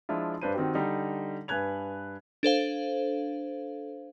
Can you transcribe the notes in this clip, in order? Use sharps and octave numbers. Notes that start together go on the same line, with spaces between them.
F3 G#3 D4 E4 F4
G2 D4 B4 C5 D#7
D#3 C4 F#4 G4
D3 G3 D#4
G2 B4 G#5 F#6 G#6 F7
D4 A4 C5 F5